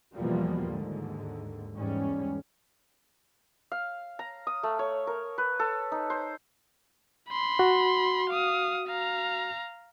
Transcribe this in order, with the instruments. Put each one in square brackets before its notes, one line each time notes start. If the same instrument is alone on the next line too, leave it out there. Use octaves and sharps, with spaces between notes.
[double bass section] E2 B2 E3 F3 G3 A#3
D#2 G#2 D3
E2 G#2 G3 C#4
[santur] F5
A#5
D#6
A3
C#5
A#4
B4
A4
D#4
C5
[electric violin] B5 C6
[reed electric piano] F#4
[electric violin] F5 D#6
F5 A#5